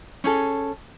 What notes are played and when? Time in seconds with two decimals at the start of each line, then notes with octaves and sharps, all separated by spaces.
0.24 C#4 G#4 A4